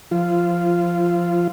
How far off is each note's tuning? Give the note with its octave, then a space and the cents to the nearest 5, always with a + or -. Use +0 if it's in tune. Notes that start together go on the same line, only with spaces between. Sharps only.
F3 +0 F4 -15